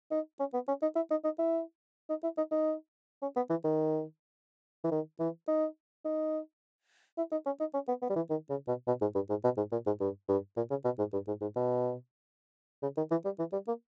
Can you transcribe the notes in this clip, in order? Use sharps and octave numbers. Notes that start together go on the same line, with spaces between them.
D#4
C#4
B3
C#4
D#4
E4
D#4
D#4
E4
D#4
E4
D#4
D#4
C#4
B3
E3
D#3
E3
D#3
E3
D#4
D#4
E4
D#4
C#4
D#4
C#4
B3
B3
G3
E3
D#3
C#3
B2
B2
G#2
G2
G#2
B2
G#2
A#2
G#2
G2
G2
A#2
C#3
B2
G#2
G2
G#2
G#2
B2
C#3
D#3
E3
G3
E3
G3
A#3